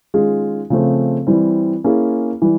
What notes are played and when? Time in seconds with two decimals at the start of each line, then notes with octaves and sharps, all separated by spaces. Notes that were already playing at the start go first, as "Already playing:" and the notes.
0.14 D#3 G#3 C#4 F4 G#4
0.70 C#3 F3 A3 C4
1.27 E3 G3 C4
1.84 A#3 C#4 E4 G#4
2.42 E3 G3